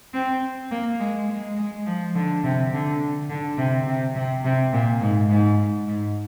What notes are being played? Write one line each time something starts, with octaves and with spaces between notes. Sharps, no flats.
C4
A#3
G#3
G#3
G#3
F3
D3
C3
D3
D3
C3
C3
C3
C3
A#2
G#2
G#2
G#2